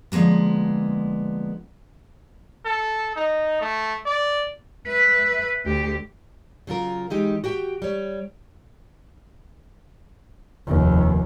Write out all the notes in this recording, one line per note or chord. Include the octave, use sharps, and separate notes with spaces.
D3 F3 G#3 A#3 B3
A4
D#4
A3
D5
B4 E5
D2 G4
C#3 F#3 F4 A#4
E3 G#3 D#4 G4
F#4 G4 G5
G3 C#5
F1 D#2